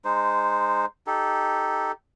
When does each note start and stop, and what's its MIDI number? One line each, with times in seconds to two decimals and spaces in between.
0.05 0.85 56
0.05 0.85 63
0.05 0.85 72
1.07 1.92 63
1.07 1.92 67
1.07 1.92 69